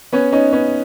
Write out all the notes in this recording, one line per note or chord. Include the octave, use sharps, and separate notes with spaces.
B3 C#4
C#4 D#4
B3 C#4